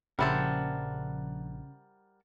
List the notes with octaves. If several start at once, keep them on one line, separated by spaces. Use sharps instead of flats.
A#1 C#3 G3 E4 A#4 C5 F#5 A5